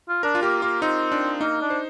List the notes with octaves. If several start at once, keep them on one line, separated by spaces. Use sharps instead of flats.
F4
D4 A#4
F4
A#3 G4
A#3 F4
C4 D#4
D4
A#3 D#4
D4
C5